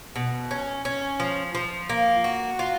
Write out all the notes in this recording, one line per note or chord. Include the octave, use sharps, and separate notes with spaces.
B2
C#4
C#4
F3
F3
A#3
F#4
F4